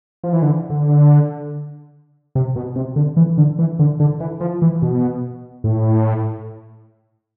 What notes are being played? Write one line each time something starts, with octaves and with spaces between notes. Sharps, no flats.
F3
E3
D3
D3
C3
B2
C3
D3
E3
D3
E3
D3
D3
E3
F3
E3
B2
A2